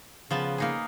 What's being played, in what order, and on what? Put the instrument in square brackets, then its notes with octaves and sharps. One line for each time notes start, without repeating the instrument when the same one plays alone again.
[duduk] C#3 [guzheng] F3 B3 A5
[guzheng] A#3 D#4 G#4